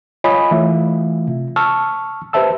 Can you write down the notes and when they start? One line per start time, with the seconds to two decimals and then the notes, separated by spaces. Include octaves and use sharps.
0.24 F4 C#5 D#5 G#5 B5 D#6
0.51 E3 A3 F4 E5
1.28 C3
1.56 A5 C#6 E6 F6
2.33 G4 B4 C5 E5 A5 E6